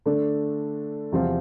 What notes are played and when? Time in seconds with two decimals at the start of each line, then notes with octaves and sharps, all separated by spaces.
0.06 D3 A3 D4
1.12 E2 C3 F3 C4 F4